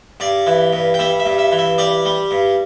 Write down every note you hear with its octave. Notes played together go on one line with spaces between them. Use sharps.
G2 D5
E3
G2
G5
G3 E5
E5
G2
E5
E3
E5
G3 D5
G3
G2